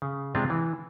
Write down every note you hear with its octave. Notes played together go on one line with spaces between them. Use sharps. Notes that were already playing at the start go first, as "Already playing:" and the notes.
C#3
C3 G#3 C4 D4 F4
E3